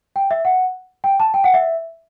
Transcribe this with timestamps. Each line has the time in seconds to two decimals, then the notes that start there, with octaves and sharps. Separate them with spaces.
0.16 G5
0.31 E5
0.45 F#5
1.04 G5
1.20 A5
1.34 G5
1.44 F#5
1.54 E5